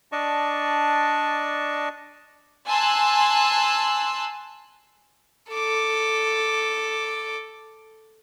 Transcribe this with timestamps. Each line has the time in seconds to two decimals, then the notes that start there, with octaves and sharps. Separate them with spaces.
0.12 D4 D5 D#5 A5 C#6
2.67 G#5 A5 C6 E6 F#6
5.52 A4 D6